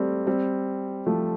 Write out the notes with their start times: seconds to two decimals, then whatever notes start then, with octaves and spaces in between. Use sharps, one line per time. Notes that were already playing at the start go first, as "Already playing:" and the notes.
Already playing: G3 A3 C4
0.27 G3 C4
1.06 F3 A3